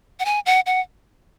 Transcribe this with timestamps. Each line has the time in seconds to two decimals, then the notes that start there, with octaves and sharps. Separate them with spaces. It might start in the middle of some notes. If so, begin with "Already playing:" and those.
0.20 F#5
0.25 G#5
0.46 F#5
0.66 F#5